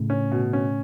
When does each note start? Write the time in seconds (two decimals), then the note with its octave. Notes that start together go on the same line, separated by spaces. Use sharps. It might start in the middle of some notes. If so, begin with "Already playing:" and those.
Already playing: A2 C#3
0.10 C#4
0.32 B2
0.53 C#4